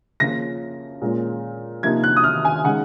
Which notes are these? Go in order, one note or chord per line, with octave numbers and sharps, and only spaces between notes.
C#3 F3 A#3 C#4 F4 A#6
A#2 G#3 C#4 F4
C3 F3 A#3 D#4 G#6
F#6
D#6
F6
G#5
C#3 G#3 D#4 F#5